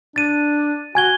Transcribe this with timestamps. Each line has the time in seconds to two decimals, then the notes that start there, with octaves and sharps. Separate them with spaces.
0.16 D4 A6 D#7
0.95 F#4 G#5 G#6 G7